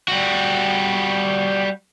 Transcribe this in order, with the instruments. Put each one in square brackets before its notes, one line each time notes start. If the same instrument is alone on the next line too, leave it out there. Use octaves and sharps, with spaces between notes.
[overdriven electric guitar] G3 F#4